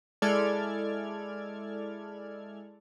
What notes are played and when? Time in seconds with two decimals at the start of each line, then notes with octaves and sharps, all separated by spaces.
0.22 G#3 E4 A4 D5 F6 G#6